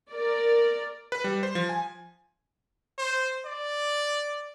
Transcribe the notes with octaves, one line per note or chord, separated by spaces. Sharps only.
A#4 D5
B4
G3
C5
F3
G#5
C5
D5